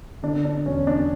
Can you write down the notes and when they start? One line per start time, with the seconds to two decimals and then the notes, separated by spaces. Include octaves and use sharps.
0.23 D3 D4
0.45 D4
0.65 E1 C#4
0.87 D4